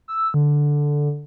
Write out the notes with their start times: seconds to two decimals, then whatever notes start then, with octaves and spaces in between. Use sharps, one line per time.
0.08 E6
0.34 D3